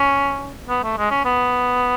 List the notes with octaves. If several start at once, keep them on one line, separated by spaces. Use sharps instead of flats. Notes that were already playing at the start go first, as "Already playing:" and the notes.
Already playing: C#4
B3
A3
G#3
C#4
B3